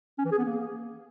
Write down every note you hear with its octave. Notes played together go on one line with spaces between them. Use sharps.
C#4
E3
G#4
B3
A#3